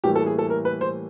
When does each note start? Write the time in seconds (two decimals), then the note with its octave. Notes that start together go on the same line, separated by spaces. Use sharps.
0.04 A2 E3 G3 A#3 G4
0.16 A4
0.26 G#4
0.39 A4
0.50 A#4
0.65 B4
0.81 C5